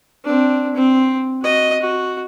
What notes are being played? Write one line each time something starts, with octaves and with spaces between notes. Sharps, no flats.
C4 D4
C4
F#4 D#5
F#4